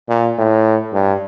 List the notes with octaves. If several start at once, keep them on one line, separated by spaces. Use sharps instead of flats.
A#2
A2
G2